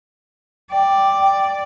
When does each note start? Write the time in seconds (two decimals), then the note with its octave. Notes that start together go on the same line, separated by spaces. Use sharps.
0.71 D5 G5